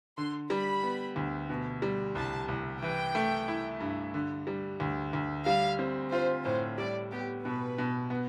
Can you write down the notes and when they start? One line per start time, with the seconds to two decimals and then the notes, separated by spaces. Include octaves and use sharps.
0.18 D3 C6
0.50 G3 B5
0.83 B3
1.16 D2
1.50 B2
1.82 G3
2.15 C2 A5
2.48 C2
2.82 E3 G5
3.15 A3
3.48 E4
3.80 G2
4.14 D3
4.47 G3
4.80 D2
5.13 D2
5.46 G3 F5
5.79 C4
6.12 F4 C5
6.45 A2 C5
6.78 G3 D5
7.12 B3 G4
7.45 B2 B4
7.78 B2
8.10 B3